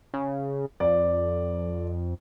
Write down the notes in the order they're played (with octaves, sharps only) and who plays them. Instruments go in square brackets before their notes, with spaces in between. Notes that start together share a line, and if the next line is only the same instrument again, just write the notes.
[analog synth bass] C#3
[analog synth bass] F2 [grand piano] D5